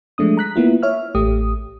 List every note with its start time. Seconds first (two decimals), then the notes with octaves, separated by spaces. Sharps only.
0.18 F3 G#3 A3 D4 D#6
0.37 A#5 F#6 B6
0.56 A#3 B3 E4 F4
0.83 C#5 E5 F6
1.15 A1 A3 G4 D#6